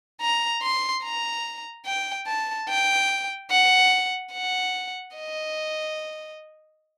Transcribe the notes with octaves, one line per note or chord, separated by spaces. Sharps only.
A#5
C6
A#5
G5
A5
G5
F#5
F#5
D#5